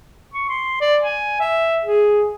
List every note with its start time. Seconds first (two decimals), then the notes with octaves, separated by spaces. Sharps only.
0.34 C#6
0.49 C6
0.81 D5
1.02 G#5
1.40 E5
1.83 G#4